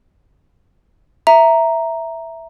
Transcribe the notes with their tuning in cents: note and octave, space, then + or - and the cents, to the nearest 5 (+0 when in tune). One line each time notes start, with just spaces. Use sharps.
E5 +0 A#5 +0